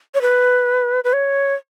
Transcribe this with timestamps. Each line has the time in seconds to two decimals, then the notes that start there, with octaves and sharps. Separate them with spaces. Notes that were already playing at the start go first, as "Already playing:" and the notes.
0.15 C#5
0.22 B4
1.04 B4
1.13 C#5